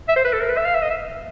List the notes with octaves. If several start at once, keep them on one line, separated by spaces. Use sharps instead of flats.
E5
C5
B4
A4
A#4
B4
E5
F5
E5
D#5
E5